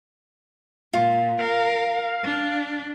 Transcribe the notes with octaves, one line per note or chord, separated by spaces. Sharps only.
A#2 F4
A#4 F5
D4